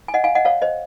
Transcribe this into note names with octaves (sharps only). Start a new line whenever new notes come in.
G#5
D#5 F#5
F5 G#5
D#5 F#5
C#5 F5
C5 D#5